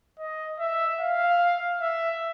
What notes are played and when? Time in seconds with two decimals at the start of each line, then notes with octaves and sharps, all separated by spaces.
0.19 D#5
0.59 E5
1.00 F5
1.81 E5